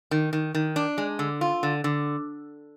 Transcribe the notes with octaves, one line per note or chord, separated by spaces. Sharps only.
D#3
D#3
D#3
D4
G#3
D3
F4
D3
D3